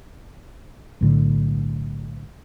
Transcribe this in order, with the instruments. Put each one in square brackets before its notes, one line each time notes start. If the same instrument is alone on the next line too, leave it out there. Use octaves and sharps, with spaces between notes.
[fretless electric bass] B1 A2 D3